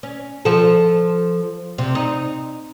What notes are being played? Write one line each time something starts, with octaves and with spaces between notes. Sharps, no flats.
C#4
F3 A4
C3
D#4